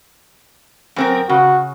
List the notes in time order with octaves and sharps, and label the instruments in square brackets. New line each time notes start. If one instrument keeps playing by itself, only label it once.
[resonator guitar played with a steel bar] F#2 C4 A#4
[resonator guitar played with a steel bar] C#3 [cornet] F#4